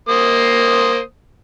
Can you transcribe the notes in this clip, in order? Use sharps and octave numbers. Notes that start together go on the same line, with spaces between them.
A#3 C5 D#6